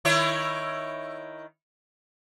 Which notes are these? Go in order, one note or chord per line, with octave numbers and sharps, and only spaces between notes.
D#3 E4 C#5